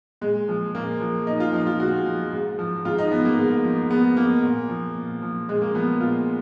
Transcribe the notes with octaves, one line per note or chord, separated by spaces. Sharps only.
A#2 G#3
F3
A#2 A#3
F3
A#2 D#4
F4
F3 D#4
F4
A#2 F#4
F3
G#2
F3
G#2 F4
D#4
F3 B3
A#3
G#2
F3
G#2 B3
F3 A#3
A#2
F3
A#2
F3
A#2 G#3
A#3
F3 B3
A#2 F4